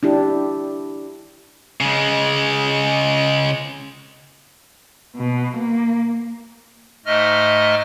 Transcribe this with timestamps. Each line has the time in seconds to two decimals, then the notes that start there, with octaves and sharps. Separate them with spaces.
0.03 D4 E4 G4
1.81 C#3 G#3
5.16 B2
5.56 A#3
7.06 G#2 A3 D#5 F6